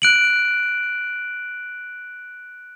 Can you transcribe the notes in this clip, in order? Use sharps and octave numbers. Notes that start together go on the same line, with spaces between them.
F#6 D7 F#7